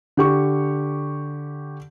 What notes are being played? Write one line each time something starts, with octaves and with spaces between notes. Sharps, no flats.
D3 G4 C#6